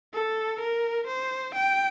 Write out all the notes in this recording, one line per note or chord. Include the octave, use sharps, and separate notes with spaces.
A4
A#4
C5
G5